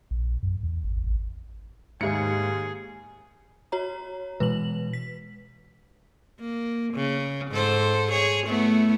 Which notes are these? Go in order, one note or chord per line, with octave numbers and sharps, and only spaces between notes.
A#1
F#2
E2
G#1
A1
D#2 G#2 G#3 G#4 C#7
F#4 C#5 A#5
B2 E3 G#3 B4 F#7
B6
A#3
C#3
G#2 A4 C5
G#4 C#5
A3 B3 E4